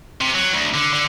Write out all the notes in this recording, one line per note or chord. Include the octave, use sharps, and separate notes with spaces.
C3
F#3
D2
D3
D3